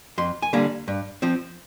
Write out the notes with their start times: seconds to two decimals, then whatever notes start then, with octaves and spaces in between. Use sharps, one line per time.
0.18 F2 C6
0.42 G#5
0.53 D3 G3 A#3 A#5
0.88 G2
1.22 F3 C4